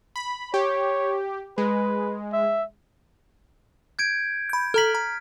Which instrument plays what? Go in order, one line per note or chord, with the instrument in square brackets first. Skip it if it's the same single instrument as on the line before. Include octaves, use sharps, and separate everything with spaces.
[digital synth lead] B5
[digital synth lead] G4 [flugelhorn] C#5
[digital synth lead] G#3 [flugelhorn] B4
[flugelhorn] E5
[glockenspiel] G6 G#6 D7
[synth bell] B5 G6
[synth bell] A4 A#5 F#7 [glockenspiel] F6 B6
[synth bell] A#5